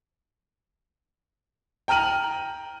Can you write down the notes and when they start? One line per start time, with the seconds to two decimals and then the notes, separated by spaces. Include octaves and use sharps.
1.88 G5 A#5 F6 D#7 F#7